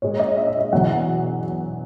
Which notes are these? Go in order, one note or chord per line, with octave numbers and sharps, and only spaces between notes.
A#2 G#3 C#5
D#5
E5
D#5
E5
E2 B2 F#3 F#5